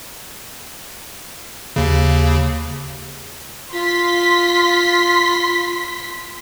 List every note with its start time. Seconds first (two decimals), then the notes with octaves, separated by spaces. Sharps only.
1.76 D#2 C#3
3.72 F4 C6 B6